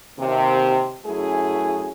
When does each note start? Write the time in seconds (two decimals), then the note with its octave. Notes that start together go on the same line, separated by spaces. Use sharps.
0.18 D#2 C3
1.05 F#2 A3 E4 G#4